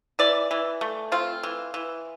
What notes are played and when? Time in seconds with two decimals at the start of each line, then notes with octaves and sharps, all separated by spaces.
0.19 E3 D5
0.51 E3
0.81 A3
1.12 C4 F4
1.43 E3
1.74 E3